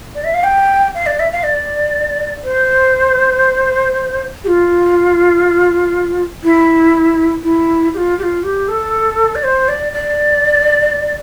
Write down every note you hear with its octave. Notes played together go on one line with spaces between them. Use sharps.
D5
E5
F5
G5
F5
D5
E5
F5
D5
C5
G4
F4
E4
E4
G4
F4
G4
F4
G4
A4
D5
C5
D5
D5